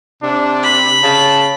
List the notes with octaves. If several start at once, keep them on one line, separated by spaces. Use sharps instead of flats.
C3 D4
B5
C#3 A5